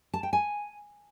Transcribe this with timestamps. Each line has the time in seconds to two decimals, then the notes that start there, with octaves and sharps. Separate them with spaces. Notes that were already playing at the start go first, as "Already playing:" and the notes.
0.13 A5
0.23 G5
0.33 G#5